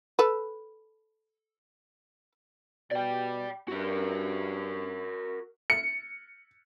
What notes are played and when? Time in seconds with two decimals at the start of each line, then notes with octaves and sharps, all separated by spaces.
0.19 A4 B4
2.92 B2 D5 G5
3.68 G2 F#4 A#4
5.70 C#7